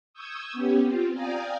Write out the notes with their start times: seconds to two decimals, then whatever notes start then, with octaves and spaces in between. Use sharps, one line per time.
0.14 C#6 D#6 E6 G6 G#6
0.53 B3 C#4 G4
0.83 C4 F4
1.13 D5 F5 G5 G#5 A#5 D#6